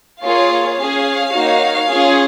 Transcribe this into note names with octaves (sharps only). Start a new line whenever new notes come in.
A#3 F4 G#4 C#5 F5
C#4 G#4 C#5 F5
A#3 D#4 F#4
C#4 F4 G#4